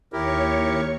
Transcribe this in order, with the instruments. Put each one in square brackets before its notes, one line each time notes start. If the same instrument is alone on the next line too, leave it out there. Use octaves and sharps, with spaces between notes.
[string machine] D#2 C#5 C#6 [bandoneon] E4 G4 A#4